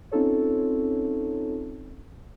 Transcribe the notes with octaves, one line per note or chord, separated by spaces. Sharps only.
C4 C#4 D#4 F4 A4 C#5